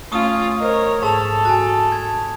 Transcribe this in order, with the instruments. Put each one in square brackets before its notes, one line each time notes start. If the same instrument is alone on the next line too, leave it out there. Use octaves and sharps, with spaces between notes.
[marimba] A3 [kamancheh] C#4 F4 [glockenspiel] C#6 D#6
[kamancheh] A#4 C#5 [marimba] C5 D#5
[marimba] G#2 [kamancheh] A4 [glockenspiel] A5 F7
[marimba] F#4 [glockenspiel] G#5 A5
[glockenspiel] G#6